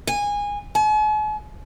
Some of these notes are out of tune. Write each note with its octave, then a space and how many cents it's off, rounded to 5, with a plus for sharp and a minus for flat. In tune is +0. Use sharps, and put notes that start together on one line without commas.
G#5 -20
G#5 +45